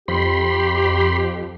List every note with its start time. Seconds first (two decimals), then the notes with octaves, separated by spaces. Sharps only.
0.08 F2 G4 B5 C6